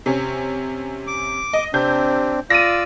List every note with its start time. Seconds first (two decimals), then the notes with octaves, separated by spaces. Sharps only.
0.06 C3 C#4
1.07 D6
1.53 D#5
1.74 C3 C4 D4 G6
2.50 F4 D5 E6 A#6 D#7